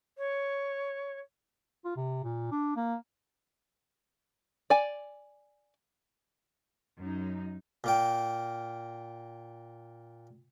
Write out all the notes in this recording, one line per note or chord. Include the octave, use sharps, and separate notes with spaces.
C#5
F4
C3
A#2
D4
A#3
D5 G#5
F#2 D#4
A#2 A#3 G5